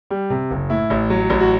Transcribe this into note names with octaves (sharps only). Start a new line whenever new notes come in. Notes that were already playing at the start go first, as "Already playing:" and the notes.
G3
C3
F#1
A2 E4
A1
F#3
A1
F#4